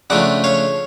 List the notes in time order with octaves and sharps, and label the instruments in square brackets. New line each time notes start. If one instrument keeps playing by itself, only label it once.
[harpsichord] C#3 F3 A3 D4 D5 F#5
C#5 F5